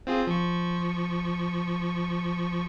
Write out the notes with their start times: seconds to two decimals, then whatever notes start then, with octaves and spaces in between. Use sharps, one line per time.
0.07 C4 F4 G#4
0.27 F3 C#6